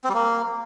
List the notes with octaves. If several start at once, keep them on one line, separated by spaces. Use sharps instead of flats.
C4
G3
A#3